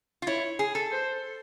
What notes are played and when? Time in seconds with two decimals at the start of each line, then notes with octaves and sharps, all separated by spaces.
0.22 F4
0.27 E4 C#5
0.59 G#4
0.75 A4
0.91 C5